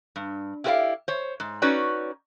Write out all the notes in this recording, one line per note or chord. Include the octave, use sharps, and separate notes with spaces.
G2
E4 F4 G4 B4 D5 F5
C5 C#5
G#2
C#4 D#4 F#4 B4 C#5 D5